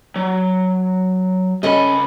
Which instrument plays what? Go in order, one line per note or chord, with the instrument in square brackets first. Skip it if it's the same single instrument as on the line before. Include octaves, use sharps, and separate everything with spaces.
[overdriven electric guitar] F#3
[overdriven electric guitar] C#2 B5 [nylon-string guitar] C#4 A4 D#5